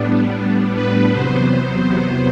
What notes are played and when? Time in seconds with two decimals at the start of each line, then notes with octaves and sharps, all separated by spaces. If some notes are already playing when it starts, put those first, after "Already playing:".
Already playing: A2 G3 B3 D4
0.75 B4
1.11 E2 C3 F#3 B3 C5
1.47 C5